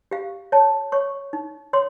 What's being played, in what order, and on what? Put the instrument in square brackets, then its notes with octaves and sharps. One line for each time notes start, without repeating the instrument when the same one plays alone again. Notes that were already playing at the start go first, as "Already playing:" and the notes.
[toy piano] G4 F5
C#5 A5
C#5 C#6
D#4
C#5 C6